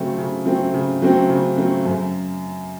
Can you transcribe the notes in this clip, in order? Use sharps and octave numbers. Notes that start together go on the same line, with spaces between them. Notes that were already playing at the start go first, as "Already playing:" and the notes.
Already playing: C#3 F#3 A3 C4
C#3
F#3 A3 C4
C#3
F#3 A3 C4
C#3
F#3 A3 C4
F#2